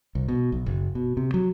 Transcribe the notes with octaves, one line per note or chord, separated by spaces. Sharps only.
C2
B2
B1
F#1
B2
C3
F#3